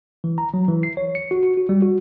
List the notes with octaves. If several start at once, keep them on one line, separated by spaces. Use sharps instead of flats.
E3
A#5
F#3
E3
C7
C#5
C#7
F#4
F#4
F#4
G3
F#4